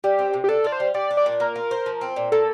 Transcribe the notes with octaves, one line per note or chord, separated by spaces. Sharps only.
G3 G4
C4
C3
G4
D4 A4
F4 D5
C5
G3
G3 D5
D4
D5
A#2
A#3 A#4
F4
C5
F3
C4
A#2
A#3 A4